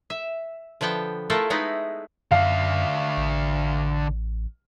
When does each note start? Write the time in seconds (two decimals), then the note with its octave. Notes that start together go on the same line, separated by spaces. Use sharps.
0.10 E5
0.81 D3 F3 B3 G5 A5
1.30 A3 E4 F4 A4 A#4
1.50 G#3 A3 B3 D#4 E4
2.31 F#2 D3 E5 F5
3.17 A1